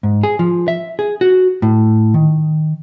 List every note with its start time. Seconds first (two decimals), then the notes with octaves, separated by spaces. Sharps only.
0.03 G#2
0.23 G#4
0.39 F3
0.68 E5
0.99 G#4
1.21 F#4
1.62 A2
2.14 D#3